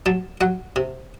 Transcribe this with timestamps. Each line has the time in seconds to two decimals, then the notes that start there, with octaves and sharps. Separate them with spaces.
0.06 F#3 A5
0.41 F#3 F#5
0.76 C3